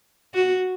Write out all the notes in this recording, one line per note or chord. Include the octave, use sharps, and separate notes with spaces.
F#4